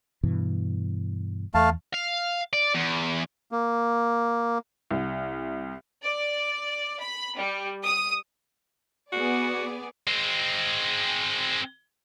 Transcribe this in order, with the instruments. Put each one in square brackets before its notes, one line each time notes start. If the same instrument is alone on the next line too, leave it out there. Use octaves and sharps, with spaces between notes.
[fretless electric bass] G2 B2 E3
[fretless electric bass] E2 [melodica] A3 F5 A5
[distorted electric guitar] F5
D5
E2
[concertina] A#3
[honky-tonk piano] C2
[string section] D5
B5
G3
D#6
[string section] B3 G#4 D5 [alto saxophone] F#4
[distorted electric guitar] G#3 C4